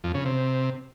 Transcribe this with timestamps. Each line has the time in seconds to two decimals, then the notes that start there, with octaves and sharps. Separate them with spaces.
0.04 F2
0.14 C#3
0.25 C3